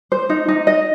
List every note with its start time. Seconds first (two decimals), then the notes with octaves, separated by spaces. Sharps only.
0.12 C5
0.30 D#4
0.48 D#4
0.67 D#5